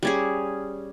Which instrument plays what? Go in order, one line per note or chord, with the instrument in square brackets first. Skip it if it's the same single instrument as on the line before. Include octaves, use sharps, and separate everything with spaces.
[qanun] G3 C#4 G#4